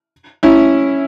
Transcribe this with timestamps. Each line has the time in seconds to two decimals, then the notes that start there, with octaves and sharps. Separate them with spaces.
0.43 C#4 E4